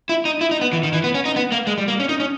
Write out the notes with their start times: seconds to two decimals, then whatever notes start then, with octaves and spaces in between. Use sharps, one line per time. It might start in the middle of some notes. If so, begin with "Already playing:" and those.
0.09 E4
0.25 D#4
0.41 E4
0.51 D#4
0.61 B3
0.73 E3
0.83 D#3
0.93 E3
1.04 B3
1.14 C#4
1.25 D#4
1.36 B3
1.52 A#3
1.67 G#3
1.78 G3
1.88 A#3
2.00 C#4
2.09 D#4
2.20 C#4